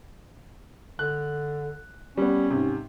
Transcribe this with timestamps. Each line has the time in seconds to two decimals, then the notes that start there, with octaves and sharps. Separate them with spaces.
0.99 D3 F#6
2.17 G3 B3 C#4
2.50 G#2 C3